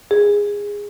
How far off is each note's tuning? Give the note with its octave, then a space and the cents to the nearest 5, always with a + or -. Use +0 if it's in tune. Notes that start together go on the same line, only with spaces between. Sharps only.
G#4 -15